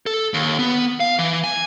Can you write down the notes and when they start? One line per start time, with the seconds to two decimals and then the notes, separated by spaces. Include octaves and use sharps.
0.06 A4
0.34 D#2
0.59 B3
1.00 F5
1.19 E3
1.44 G#5